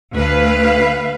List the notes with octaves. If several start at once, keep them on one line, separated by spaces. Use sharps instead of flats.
D2 B4 F5